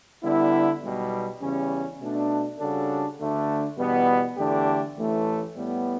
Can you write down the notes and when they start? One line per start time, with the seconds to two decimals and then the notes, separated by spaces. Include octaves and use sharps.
0.23 D3 G3 B3 E4
0.82 B1 B2 G3
1.41 E2 C#3 G3 C#4
2.00 B2 A3 D4
2.60 C#3 G3 D4 F#4 A4
3.19 D2 D3 A3 D4
3.78 E2 B2 G3 B3
4.37 E2 D3 A3 D4 G4
4.97 A1 A2 E3 A3
5.56 A2 G3 B3